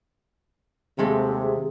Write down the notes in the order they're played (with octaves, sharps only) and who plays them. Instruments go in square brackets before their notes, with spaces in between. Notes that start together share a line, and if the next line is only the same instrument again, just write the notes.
[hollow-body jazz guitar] D#2 G#3 A3 [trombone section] C3 [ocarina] G#4